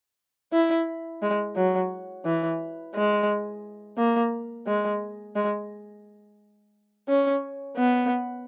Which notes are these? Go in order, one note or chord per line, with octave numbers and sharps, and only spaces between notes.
E4
G#3
F#3
E3
G#3
A#3
G#3
G#3
C#4
B3